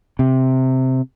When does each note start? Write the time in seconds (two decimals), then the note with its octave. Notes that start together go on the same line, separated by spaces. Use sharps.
0.19 C3